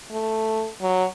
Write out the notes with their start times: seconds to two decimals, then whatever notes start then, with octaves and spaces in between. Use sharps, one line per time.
0.11 A3
0.82 F#3